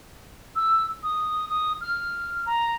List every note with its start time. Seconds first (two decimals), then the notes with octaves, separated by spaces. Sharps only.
0.56 E6
1.03 D#6
1.49 D#6
1.81 F6
2.46 A#5